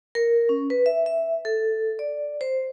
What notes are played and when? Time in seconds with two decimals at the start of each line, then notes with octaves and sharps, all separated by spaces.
0.15 A#4
0.49 C#4
0.70 B4
0.86 E5
1.06 E5
1.45 A4
1.99 D5
2.41 C5